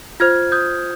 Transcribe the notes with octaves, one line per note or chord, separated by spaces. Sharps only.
F4 C5 F6 G#6
D#6 G6